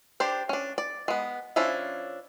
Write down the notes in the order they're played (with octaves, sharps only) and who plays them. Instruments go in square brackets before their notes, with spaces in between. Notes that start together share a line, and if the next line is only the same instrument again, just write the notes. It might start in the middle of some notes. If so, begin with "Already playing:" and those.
[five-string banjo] D4 G4 C5
C#4 D4
D5
G#3 B3
F3 C#4 D4 E4